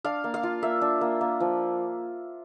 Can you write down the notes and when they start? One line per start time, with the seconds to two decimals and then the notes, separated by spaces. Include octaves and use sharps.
0.04 D4 F5
0.24 A#3
0.34 F5
0.43 F4
0.62 A#3 E5
0.81 D4
1.01 A#3
1.21 A#3
1.40 F3